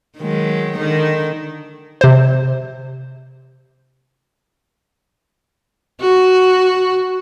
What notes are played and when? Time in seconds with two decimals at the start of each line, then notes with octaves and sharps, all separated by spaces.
0.17 D#3 F#3 G#3
0.77 D3 D#3 D#4
2.01 C3 C5
6.01 F#4